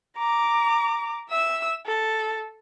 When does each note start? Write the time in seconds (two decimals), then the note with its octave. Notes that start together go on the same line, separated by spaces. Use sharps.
0.17 A#5 D6
1.29 E5 E6
1.86 A4